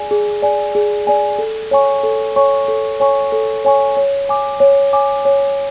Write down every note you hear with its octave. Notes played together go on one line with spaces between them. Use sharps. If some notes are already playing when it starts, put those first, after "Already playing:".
Already playing: G#4 D5 G#5
G#4
D5 G#5
G#4
D5 G#5
A4
C#5 G#5 C#6
A4
C#5 G#5 C#6
A4
C#5 G#5 C#6
A4
C#5 G#5 C#6
C#5
G#5 D6
C#5
G#5 D6
C#5